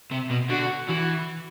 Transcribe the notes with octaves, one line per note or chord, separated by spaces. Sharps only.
C3
B2
D3 F#4
E3 F#4